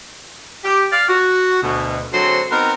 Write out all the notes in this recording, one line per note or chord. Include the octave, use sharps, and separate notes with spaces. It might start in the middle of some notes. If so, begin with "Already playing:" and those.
G4
D5 F5
F#4
D2 B2
D3 F#3 G#3 C4 C5
B3 C4 D#4 A#4